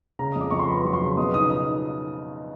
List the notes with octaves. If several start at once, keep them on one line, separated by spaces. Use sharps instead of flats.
C#3 A#5
F2 D#6
D6
F2 C#6
C6
B3 B5
F#3
C6
C#3
B2 D#6
D#4 D#6
D#4 D#6